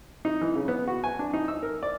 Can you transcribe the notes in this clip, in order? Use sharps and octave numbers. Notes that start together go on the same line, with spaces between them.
D#4
E3
C#3
B3
F#4
G#5
D4
D#4
E6
A#4
D5